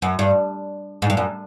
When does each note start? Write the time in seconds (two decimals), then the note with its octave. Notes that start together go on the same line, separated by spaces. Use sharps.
0.02 F#2
0.19 G2
1.02 G#2
1.10 G2
1.17 F#2